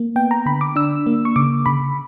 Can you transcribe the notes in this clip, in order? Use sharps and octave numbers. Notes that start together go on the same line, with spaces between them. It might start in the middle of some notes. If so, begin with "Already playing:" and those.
Already playing: A#3
B3 G5
A#5
D3 B5
D6
D4 E6
A#3
C#6
C#3 D6
C#3 B5